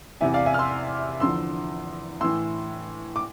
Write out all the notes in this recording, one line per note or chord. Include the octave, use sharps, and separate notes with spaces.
E2 C3 E3 E5 G#5
D5 F5
E5 G#5
F6
C6 E6
E2 D3 F3 C6 E6
A2 E3 C6 E6
D6